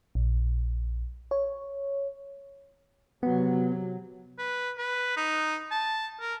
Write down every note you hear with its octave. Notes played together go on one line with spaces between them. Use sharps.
A#1
C#5
C3 F#3 B3
B4
B4
D#4
A5
A#4